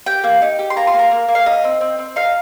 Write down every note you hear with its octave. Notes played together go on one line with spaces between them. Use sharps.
G4 G5
A#3
D#4
G4
C6
A#3 A#5
C6
A#3
A#5
A#3
A#3
F5
D#4 D#5
C4
C4
C4
D#4 F5